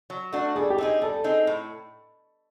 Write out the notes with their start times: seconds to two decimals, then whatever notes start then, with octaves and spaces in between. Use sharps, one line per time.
0.10 F#3
0.32 A3 D4 F#4
0.56 G3 G#4
0.70 G4
0.78 C4 D#4 G#4
1.01 G3 A4
1.24 C4 D#4 G#4
1.47 A2